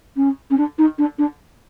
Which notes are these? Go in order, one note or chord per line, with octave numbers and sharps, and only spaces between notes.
C#4
C#4
D4
D#4
D4
D4